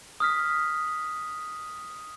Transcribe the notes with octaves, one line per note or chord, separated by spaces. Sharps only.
D#6 F6 B6